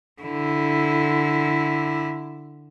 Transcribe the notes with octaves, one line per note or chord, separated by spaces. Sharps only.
D3 E4